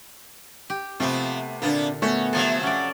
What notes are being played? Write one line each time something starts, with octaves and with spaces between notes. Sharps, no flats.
G4
C3 F3 A3 B3 C4
A#2 D3 A#3 B3 D4
A3 B3 C#4 F#4
C3 F3 F#3 A4 G#5
C#4 D5 F#5